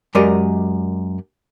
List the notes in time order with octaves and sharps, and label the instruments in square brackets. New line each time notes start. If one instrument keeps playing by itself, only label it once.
[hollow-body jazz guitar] F#2 G#3 G4 A#4 D5 D#5